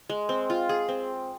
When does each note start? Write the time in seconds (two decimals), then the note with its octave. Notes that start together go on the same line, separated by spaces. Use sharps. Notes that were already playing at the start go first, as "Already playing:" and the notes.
0.09 G#3
0.29 C4
0.50 F4
0.69 G#4
0.89 C4